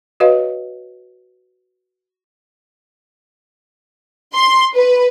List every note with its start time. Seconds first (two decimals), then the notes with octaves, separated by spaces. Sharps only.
0.20 F#4 B4 C#5 D#5 F5
4.34 C6
4.75 B4